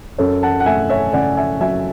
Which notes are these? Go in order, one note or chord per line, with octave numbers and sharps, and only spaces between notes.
F#2 A4 C#5
F#5 A5
F#5
A3 E5 G#5
C#5 E5
C#3 D5 F#5
E5 G#5
F#3 E5 G#5